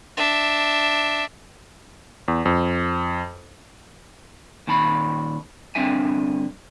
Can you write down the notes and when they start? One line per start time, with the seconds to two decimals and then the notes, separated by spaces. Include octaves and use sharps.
0.17 D4 E5
2.28 E2
2.45 F2
4.68 A#2 D#3 A5 B5
5.75 G2 D3 C4 D4 E5 G#5